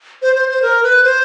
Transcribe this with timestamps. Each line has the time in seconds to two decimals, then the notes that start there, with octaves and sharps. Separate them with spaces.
0.22 C5
0.35 C5
0.49 C5
0.62 A#4
0.83 B4
1.04 C5